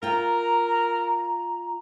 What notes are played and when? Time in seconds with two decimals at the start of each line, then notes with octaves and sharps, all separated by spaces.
0.03 F4 A#4 G5 A#5